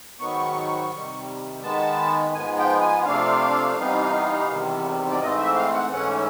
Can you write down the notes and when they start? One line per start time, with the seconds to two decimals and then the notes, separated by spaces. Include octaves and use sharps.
0.19 G#2 D#3 F#3 B3 C#6
0.92 C3 D#3 G3
1.63 D#3 G#3 B3 A5
2.34 G#2 F3 G#3 B3 G#5
2.58 G5
2.82 G#5
3.05 C3 F3 A3 D4 F5
3.77 C3 E3 G3 B3 D#4
4.49 E2 C3 D#3 G3
5.11 D5
5.21 G#2 E3 A3 C4 D#5
5.38 E5
5.55 F5
5.74 F#5
5.91 G#2 E3 A3 C#4 F#5